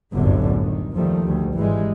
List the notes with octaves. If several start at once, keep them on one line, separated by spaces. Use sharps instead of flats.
G1 C2 F#2 A2 D3
D#3
D#2 D#3 F3 G3 A3
D2 G3
G#1 E3 G3 G#3